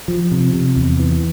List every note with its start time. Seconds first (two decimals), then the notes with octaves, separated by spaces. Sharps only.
0.08 F3
0.32 C3
0.53 C3
0.77 E2
0.99 E3